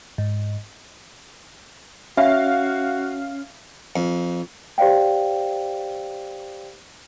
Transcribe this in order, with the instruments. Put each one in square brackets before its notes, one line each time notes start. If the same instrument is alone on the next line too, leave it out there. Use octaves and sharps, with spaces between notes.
[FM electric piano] G#2
[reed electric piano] C#4 [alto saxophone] F#4 [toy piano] E5 [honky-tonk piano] F5
[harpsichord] F2
[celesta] G4 C5 D5 F5 G5